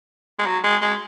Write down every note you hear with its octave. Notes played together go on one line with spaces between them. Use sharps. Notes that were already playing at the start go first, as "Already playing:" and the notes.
G#3
F#3
G#3
G#3